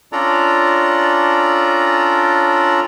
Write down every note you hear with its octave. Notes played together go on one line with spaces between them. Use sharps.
C#4 D4 F4 A4 D5 A#5